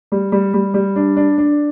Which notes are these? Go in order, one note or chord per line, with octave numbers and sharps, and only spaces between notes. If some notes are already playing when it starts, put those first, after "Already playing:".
G3
G3
G3
G3
D4
D4
D4